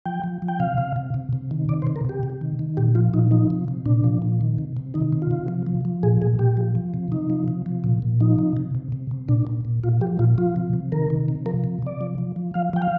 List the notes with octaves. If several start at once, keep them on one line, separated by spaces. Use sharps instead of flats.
F3 G5
F3
F3
G5
C3 F5
C3
C3
C3
C3
D#3
C3 D5
C5
C3
A#4
C3 G4
C3
D#3
D#3
A#2 G4
F3 F4
A#2 D#4
F3 D#4
C3
C3
A#2 D4
F3
A#2
D#3
C3
C3
D#3 D#4
C3
F4
C3
F3
F3
F3
A#2 G#4
A#2 G#4
A#2 G4
F3
F3
C3
C3 D#4
F3
C3
F3
A#2
A#2
F3 D#4
C3
C3
C3
C3
C3
A#2 D4
A#2
A#2
A#2 F4
F3 G4
A#2 F4
F3 F4
C3
C3
D#3 A#4
D#3
C3
F3 A#4
C3
C3 D5
F3
F3
F3
F3 F5
F3 G5
F5